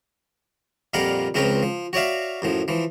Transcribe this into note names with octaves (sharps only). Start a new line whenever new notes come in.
F2 A#2 G3 A#4 F5 F#5
C#2 F3 C4 A#4 B4 C#5
F3
F#4 C#5 D5 E5 F5
F#2 A2 F3
E3 F3